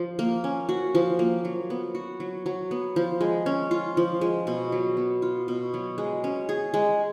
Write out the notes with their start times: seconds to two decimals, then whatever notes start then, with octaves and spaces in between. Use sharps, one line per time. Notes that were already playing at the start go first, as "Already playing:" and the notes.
Already playing: F3
0.19 A#3
0.44 C#4
0.69 F#4
0.95 F3
1.19 A#3
1.45 F#3
1.70 B3
1.95 F#4
2.20 F#3
2.46 F#3
2.71 B3
2.96 F3
3.21 G#3
3.46 C#4
3.71 F4
3.97 F3
4.21 G#3
4.47 B2
4.72 F#3
4.97 B3
5.22 F4
5.48 B2
5.74 F#3
5.98 G#3
6.24 C#4
6.49 G#4
6.74 G#3